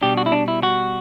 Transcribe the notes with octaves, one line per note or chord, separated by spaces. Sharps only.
B2 G3 D4 G4
F#4
E4
D4
E4
F#4